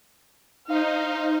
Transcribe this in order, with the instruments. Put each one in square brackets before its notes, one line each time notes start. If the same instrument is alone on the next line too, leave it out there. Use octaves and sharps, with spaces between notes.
[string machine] D#4 [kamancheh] C5 F5